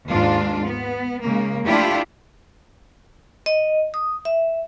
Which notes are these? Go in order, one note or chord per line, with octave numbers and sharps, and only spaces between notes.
D#2 G#2 D4 F4
B3
C#3 G#3 A#3
A3 D4 E4 F4 G4
D#5
D#6
E5